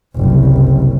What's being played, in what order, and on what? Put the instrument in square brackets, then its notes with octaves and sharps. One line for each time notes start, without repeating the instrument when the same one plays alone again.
[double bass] F#1 C2